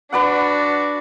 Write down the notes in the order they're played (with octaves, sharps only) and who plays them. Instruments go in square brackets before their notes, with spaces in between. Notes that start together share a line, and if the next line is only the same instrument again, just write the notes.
[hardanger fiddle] D4 F#4 [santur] B4 D5 F#5